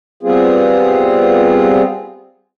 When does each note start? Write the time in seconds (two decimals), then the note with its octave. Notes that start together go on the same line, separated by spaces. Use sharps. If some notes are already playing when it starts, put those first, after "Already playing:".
0.23 G3 B3 C4 F4 G#4